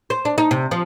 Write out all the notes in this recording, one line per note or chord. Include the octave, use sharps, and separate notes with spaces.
C5
D4
D#4
C3
F3